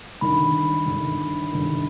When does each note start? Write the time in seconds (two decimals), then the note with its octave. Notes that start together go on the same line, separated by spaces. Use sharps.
0.21 G1 G2 D#3 B5
0.86 G1 G2 D#3
1.52 G1 G2 D#3